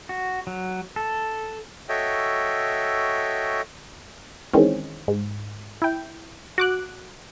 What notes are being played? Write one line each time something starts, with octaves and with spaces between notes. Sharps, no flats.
F#4
F#3
A4
F#4 A4 C#5 D#5 E5 G5
D#3 E3 G#3 C4 C#4
G#2
E4 G5
F#4 D6 F#6